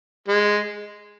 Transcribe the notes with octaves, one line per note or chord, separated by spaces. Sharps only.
G#3